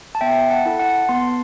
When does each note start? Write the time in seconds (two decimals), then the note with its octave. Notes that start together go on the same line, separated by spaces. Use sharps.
0.15 A5
0.21 B3 E5 G5
0.50 F#5 A5
0.65 E4 A4
0.79 F#5 A5
1.09 B3 A5 C6